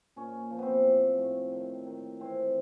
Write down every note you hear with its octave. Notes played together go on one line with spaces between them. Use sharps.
A#2 C#4
F3
B3 C4
A2
A2
D#3
D#3
E3 C4